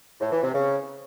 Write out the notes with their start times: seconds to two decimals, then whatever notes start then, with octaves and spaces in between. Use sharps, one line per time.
0.21 A2
0.32 E3
0.43 C3
0.54 C#3